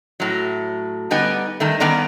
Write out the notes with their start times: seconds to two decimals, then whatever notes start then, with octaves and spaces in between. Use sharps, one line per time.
0.20 A2 F#3
1.11 D3 G3 B3 D#4 G#5
1.60 G2 D#3 A3
1.80 G2 D#3 B3 D5 A#5